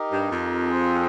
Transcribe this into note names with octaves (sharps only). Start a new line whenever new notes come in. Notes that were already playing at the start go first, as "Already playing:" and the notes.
Already playing: D#4 G4 A#4 D#5
G2
F2
C4 F4 G#4